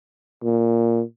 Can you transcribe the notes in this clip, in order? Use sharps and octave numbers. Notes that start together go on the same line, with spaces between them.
A#2